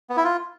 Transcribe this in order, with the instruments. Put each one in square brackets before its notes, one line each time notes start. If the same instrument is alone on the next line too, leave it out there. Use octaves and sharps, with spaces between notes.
[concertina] B3
E4
F4